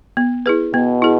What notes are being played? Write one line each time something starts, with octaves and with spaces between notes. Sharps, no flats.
B3
E4 G#4 B4
B2 B3
E4 G#4